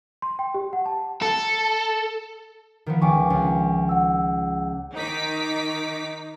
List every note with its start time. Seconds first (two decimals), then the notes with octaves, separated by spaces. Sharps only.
0.22 C6
0.39 G5
0.54 G4
0.73 F#5
0.86 A5
1.22 A4
2.86 D#3 F3 B3
3.01 C#2 G5 G#5 C#6 D6
3.30 C#2
3.89 F#5 E6
4.94 D#3 D#4 D6 B6